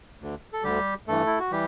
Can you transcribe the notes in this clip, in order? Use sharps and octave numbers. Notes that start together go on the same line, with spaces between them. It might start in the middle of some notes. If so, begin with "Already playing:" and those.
D2 D3
A4
D2 D3 G3 G4
G2 E3 A3 A4
E4
F#4
E3 G3 G4